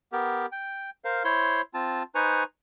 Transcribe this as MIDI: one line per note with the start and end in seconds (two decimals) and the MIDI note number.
0.13 0.46 59
0.13 0.46 67
0.13 0.46 70
0.52 0.90 79
1.05 1.23 70
1.05 1.23 72
1.05 1.23 77
1.24 1.61 64
1.24 1.61 72
1.24 1.61 73
1.24 1.61 84
1.74 2.03 60
1.74 2.03 65
1.74 2.03 81
2.15 2.44 63
2.15 2.44 71
2.15 2.44 72
2.15 2.44 80
2.15 2.44 82
2.15 2.44 85